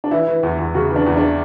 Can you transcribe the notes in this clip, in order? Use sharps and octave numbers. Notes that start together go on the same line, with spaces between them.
D4
E3 E4
E3
E2
E2
C#3 F#4
E3
D4
E2
D4